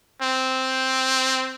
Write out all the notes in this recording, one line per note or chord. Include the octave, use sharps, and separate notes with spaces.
C4